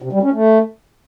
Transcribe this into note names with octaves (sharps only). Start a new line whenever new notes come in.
C3
G3
C#4
A3